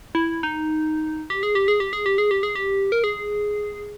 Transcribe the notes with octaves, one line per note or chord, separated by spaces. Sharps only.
E4
D#4
G4
G#4
G4
G#4
G4
G#4
G4
G#4
G4
G#4
G4
A#4
G#4